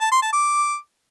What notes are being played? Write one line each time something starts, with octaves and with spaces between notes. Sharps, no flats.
A5
C6
A5
D6